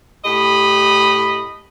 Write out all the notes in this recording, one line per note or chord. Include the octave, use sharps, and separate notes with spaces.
A2 G4 D#5 B5